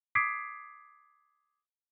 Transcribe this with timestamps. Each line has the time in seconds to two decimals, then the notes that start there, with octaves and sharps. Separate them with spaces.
0.15 D6 D#6 G#6 B6 C7 D7